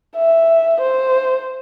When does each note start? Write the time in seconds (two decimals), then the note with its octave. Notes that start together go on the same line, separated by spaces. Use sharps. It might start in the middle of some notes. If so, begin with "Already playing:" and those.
0.16 E5
0.81 C5